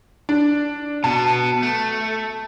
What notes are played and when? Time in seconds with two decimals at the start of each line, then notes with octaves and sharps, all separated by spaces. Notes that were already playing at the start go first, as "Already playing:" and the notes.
0.29 D4
1.04 B2 B3 A5
1.63 A3